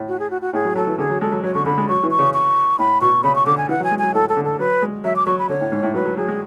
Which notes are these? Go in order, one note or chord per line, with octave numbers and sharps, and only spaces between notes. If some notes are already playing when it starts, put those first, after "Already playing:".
Already playing: A2
F#4
G#4
F#4
F#4
A2 G#4
F#3
F#3 A4
E3
D3 G#4
F#3
G#3 A4
F#3
F#3 C#5
D3 C#6
D3 B5
G#3
F#3 C#6
E3
C#6
C#3
C#6
A2 B5
B2 C#6
C#3 B5
C#6
D3 D6
G#5
E3 F#5
F#3
G#5
G#3
F#3 G#5
A2 A4
A4
D3
A4
F#3 B4
G#3
F#3 E5
D6
F#3 C#6
B5
D3 C#5
A2
G#2
A2
F#3 B4
F#3
F#3 G#4
G#3